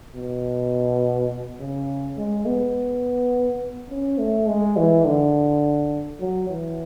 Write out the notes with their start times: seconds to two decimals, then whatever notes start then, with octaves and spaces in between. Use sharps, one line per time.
0.15 B2
1.59 C#3
2.17 G#3
2.46 B3
3.90 C#4
4.19 A3
4.47 G#3
4.77 E3
5.05 D3
6.20 F#3
6.49 E3